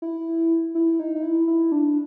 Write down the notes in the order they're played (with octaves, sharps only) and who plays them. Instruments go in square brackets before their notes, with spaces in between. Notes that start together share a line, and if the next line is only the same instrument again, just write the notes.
[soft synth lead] E4
E4
D#4
D#4
E4
E4
D4